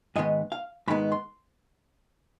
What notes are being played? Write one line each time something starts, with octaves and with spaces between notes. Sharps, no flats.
G#2 D#3 G#3 B3 D#5
F5
G#2 D#3 G#3 B3 B5
C6